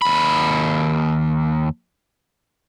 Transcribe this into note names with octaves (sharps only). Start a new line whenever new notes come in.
D#2 B5